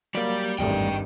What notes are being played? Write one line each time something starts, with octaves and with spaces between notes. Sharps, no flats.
F#3 G3 A#3 D5
G#1 E2 G2 G3 A3 D#5 G5